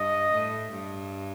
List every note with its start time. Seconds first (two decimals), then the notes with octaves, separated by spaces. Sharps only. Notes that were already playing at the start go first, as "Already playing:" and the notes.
Already playing: G2 D#5
0.32 A2
0.72 G2